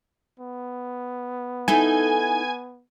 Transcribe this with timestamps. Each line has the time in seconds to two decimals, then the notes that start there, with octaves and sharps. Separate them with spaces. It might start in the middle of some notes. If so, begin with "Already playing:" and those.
0.40 B3
1.68 D#4 E4 A4 G#5